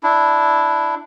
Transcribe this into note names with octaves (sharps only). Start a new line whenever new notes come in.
D4 E4